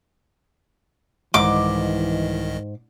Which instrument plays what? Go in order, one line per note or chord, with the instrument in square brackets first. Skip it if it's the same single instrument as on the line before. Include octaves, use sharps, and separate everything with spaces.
[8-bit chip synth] C2 D#3 D#5 [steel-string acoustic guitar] G#2 [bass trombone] E3 [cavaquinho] D6